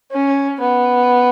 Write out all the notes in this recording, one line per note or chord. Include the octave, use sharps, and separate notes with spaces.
C#4
B3